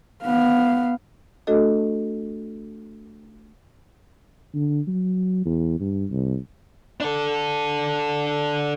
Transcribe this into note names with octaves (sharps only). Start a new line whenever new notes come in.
B3 F5
A3 D4 F#4 A4 D#5
D3
F#3
E2
G2
C2
D4 A4